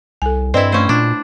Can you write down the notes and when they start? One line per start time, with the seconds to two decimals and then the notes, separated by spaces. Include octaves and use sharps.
0.22 C2 A4 G#5
0.54 G2 C4 E4 B4 D5 D#5
0.72 A3 C#4 C5 C6
0.89 A#2 D4